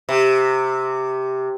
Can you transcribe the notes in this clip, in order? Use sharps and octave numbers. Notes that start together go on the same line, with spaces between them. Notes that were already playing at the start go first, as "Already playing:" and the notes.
C3